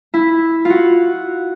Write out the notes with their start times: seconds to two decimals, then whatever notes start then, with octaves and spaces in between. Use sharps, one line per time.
0.14 E4
0.65 F4 F#4